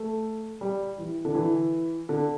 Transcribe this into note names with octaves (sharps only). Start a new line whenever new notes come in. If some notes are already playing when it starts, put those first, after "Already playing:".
Already playing: A3
G3
E3
D3
E3
D3